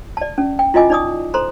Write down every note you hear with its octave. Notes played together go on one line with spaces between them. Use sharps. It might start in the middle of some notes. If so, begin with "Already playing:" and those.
D5 A5
C#4
G5
E4 F4 D#5 G#5 D6
D#4 D5 D6 D#6
A4 C5 A#5 C6